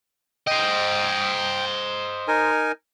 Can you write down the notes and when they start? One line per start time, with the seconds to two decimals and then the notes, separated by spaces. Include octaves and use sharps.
0.47 C5 D#5 G5
2.28 D#4 A#4 G#5